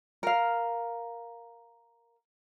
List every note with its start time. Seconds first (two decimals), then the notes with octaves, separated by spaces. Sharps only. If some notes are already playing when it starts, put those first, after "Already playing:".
0.23 A#4 F5